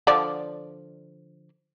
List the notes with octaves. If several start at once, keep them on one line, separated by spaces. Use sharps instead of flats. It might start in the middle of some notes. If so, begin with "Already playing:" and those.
D3 F3 D5